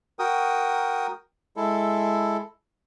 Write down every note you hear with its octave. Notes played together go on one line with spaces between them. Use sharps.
F#4 A#4 G5 D#6
G#3 E4 A4